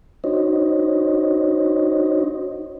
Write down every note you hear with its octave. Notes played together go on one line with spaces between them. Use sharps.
D4 D#4 F#4 C5 C#5 D#5